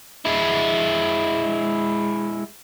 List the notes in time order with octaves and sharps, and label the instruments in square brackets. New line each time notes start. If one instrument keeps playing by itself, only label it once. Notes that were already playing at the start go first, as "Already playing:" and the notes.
[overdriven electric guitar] G#3 E4